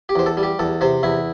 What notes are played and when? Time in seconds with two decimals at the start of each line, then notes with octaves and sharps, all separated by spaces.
0.09 G4
0.15 E2 C5
0.26 A4
0.37 G3
0.43 G4
0.59 E2 A4
0.81 C3 C5
1.03 E2 E4